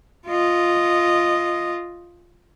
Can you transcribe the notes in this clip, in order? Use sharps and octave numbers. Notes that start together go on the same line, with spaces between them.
F4 D#5